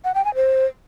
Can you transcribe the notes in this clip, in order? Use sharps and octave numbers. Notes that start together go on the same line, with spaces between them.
F#5
G5
G#5
C5